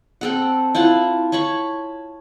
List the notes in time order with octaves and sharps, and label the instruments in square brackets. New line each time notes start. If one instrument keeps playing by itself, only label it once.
[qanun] C4 A4 F#5
E4 F4 F#5 A5
C#5 A5 B5 C#6